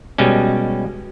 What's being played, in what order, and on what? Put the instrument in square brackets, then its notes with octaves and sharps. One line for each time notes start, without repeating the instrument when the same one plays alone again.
[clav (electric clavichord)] B2 G3 G#3 C#4